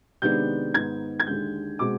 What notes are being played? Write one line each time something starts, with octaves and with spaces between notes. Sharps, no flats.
C3 D#3 G#3 B3 D4 G6
G#2 D#3 B3 D#4 G#6
G#6
D#2 D3 G#3 G6
B2 G#3 C4 D6